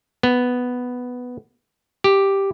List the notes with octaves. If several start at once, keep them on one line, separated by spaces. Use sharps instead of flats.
B3
G4